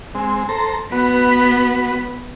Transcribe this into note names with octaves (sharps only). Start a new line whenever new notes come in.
G#3 C4
A4 C5 A#5
B3 F#4 B4